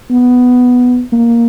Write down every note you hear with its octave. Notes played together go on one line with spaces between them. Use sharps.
B3
A#3